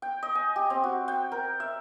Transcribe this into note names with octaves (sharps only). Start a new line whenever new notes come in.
G5
D#5
G#5
G4
C4
F#4
G5
A#4
E5